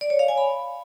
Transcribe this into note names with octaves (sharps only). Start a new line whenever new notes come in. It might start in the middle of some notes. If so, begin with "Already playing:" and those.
D5
C#5
F5
G#5
B5